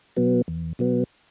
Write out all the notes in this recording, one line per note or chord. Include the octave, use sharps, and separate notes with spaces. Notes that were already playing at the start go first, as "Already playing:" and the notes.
B2 F#3 B3
E2
B2 F#3 B3